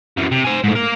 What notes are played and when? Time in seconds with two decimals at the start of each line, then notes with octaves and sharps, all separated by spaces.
0.17 F#2 E3
0.31 C3
0.44 C5 G#5
0.64 G#2 A3
0.75 A#3 A#4